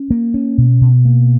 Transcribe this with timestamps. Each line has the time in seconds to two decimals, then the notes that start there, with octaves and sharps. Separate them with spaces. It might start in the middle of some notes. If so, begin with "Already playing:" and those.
Already playing: C#4
0.11 A#3
0.34 C#4
0.58 B2
0.81 B2
1.05 A#3